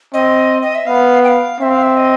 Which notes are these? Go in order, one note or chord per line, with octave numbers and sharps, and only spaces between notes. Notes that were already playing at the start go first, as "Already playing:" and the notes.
C4 D#5
D#5
E5
B3 F5
G5
F5
C4 E5
F5
E5
D#5